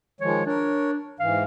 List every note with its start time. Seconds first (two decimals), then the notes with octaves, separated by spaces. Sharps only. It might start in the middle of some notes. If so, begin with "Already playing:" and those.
0.21 D#3 F3 G#3 C#5
0.46 D4 A#4 C#5
1.20 G#2 E3 F5